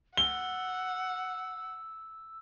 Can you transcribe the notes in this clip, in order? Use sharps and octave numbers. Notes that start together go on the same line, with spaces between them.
F#5 E6 G7